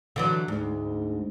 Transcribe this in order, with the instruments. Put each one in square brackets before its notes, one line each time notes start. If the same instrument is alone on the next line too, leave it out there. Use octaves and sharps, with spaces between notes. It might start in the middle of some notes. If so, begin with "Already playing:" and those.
[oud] D3 E3 F#3
[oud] D2 [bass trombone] G#2